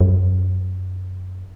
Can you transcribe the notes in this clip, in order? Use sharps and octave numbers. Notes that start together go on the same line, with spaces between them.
F#2